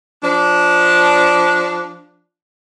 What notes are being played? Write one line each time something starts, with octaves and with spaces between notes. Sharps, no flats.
F3 D4